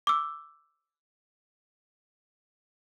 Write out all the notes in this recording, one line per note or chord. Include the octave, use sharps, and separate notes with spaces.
D6 E6